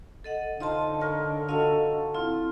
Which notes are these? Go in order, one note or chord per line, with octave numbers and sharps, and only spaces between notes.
A4 D#5 F#5
D3 D#4 F4 C5 D#5 A5
A4 A#4 C#5
F4 F#4 A4 D#5 F5
C4 E4 F4